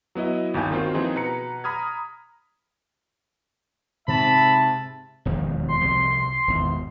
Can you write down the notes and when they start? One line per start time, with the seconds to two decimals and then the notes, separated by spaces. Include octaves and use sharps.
0.15 F#3 B3 E4 D#5
0.54 G1 D#2 D#4 G#5 G6
0.71 D#3 A#3 C4 F4 F#4 C5
0.94 E3 F3 C4 D#4 G#4
1.15 B2 B4 A#5 C#7
1.64 A#5 B5 D#6 F6 G#6
4.08 G#2 C3 E5 A5 B5
5.25 E1 D#2 F3
5.68 C6
5.81 C2 C3 F3
6.48 G#1 E2 B2